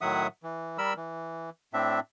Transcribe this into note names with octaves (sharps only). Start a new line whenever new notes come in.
A2 D#3 F#3 E5 F#5 D#6
E3
G3 A#4 B5 E6
E3
A2 C4 D4 E5